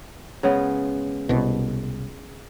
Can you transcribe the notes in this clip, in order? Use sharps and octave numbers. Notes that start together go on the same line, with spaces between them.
C#3 G#3 B3
C2 B2